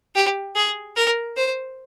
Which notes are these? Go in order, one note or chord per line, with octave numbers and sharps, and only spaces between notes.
G4
G#4
A#4
C5